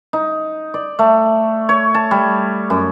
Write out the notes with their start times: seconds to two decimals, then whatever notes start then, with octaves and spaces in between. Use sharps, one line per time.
0.13 D#4
0.74 D5
0.99 A3
1.69 C#5
1.94 A5
2.11 G3
2.70 F#2